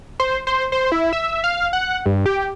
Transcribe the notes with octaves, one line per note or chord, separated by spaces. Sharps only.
C5
C5
C5
E4
E5
F5
F#5
G2
G4